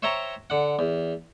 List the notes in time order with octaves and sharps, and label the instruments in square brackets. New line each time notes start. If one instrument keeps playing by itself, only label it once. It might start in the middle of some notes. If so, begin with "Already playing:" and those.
[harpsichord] C5 C#5 E5 G5 A#5 C#6
D3 F#5
E2